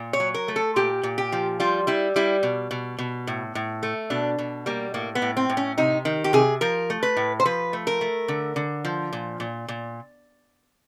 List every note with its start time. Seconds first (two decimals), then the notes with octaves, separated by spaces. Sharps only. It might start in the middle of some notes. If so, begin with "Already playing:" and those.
Already playing: A#2
0.13 C#5
0.20 F#3
0.34 A#4
0.48 A3
0.56 A4
0.76 A#2 G4
1.03 A#2
1.18 G4
1.32 F3
1.60 G3 F4
1.87 G3 E4
2.16 G3 E4
2.43 B2
2.71 B2
2.99 B2
3.27 A2
3.55 A2
3.83 A3
4.10 B2 D4
4.39 B2
4.66 G3 A#3
4.94 A2 A#3
5.15 B3
5.22 A2
5.37 C4
5.50 A2
5.57 C#4
5.78 C3 D#4
6.05 D#3
6.24 G4
6.33 C3 G#4
6.61 F3 A#4
6.90 A3
7.03 B4
7.17 A2
7.40 C5
7.45 F3 B4
7.73 A3
7.87 A#4
8.01 A3
8.28 D3
8.56 D3
8.85 F3
9.13 A#2
9.40 A#2
9.68 A#2